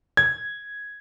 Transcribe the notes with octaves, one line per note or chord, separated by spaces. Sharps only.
G#6